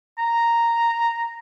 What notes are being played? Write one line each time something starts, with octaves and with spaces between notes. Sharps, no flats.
A#5